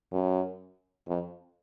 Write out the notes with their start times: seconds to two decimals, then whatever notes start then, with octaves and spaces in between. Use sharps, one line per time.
0.12 F#2
1.08 F2